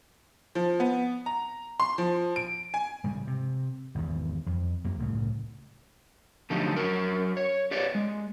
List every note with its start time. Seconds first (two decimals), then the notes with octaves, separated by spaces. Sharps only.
0.55 F3
0.80 B3
1.26 A#5
1.80 C6
1.98 F3
2.36 D7
2.74 G#5
3.04 G#2 C#3 G3
3.27 C3
3.95 G#1 E2
4.46 F2
4.84 F#2 A#3
4.99 C2 A2 C#3
6.50 D3 F3 F#3 A3 D#4 G4
6.76 F#3 A#4
7.37 C#5
7.71 G4 B4 C#5 D5
7.95 G#3